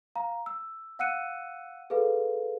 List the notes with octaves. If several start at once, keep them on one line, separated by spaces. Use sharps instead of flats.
F5 A#5
E6
F5 F#5 E6 F#6 C#7 D#7
G#4 A4 B4 F5